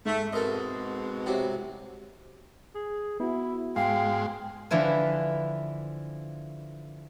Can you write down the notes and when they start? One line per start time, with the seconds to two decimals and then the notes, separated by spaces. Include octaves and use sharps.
0.05 G#2 A3
0.33 B2 G#3 C4 A4 A#4 D#5
1.26 C3 F#3 E4
2.75 G#4
3.20 B3 E4 F#4
3.76 G#2 G#3 F5 G5 C6
4.71 D3 E3 F3 E4 B4